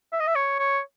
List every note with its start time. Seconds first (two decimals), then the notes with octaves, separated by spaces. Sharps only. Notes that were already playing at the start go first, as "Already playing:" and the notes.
0.13 E5
0.20 D#5
0.27 E5
0.35 C#5
0.59 C#5